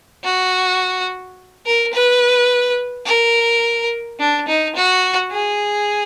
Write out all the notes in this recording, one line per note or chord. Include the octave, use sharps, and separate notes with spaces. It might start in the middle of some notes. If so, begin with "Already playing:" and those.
F#4
A#4
B4
A#4
D4
D#4
F#4
G#4